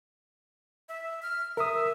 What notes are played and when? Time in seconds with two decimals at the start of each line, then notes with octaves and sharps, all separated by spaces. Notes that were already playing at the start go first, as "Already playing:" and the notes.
0.89 E5
1.23 F6
1.57 A#4 E5 D#6